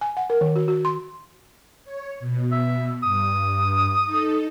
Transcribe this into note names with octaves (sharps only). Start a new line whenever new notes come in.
G#5
F#5
A#4
D#3
F#4
F#4
C6
C#5
B2
E5
G2 D#6
D#4 A4